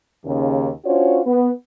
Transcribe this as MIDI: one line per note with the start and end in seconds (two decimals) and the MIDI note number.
0.25 0.69 39
0.25 0.69 49
0.85 1.19 61
0.85 1.19 62
0.85 1.19 65
0.85 1.19 66
0.85 1.19 72
0.85 1.19 73
1.26 1.49 59